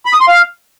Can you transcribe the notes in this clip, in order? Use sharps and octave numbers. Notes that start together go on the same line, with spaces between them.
B5
D#6
C6
F5